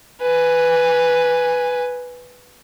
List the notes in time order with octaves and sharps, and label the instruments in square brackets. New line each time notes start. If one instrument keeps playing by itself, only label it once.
[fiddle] B4 G#5